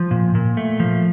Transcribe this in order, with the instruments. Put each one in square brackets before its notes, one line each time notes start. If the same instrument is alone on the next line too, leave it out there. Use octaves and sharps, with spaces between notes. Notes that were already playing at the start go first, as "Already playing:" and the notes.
Already playing: [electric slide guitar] F3
A#2
A#2
A3
F3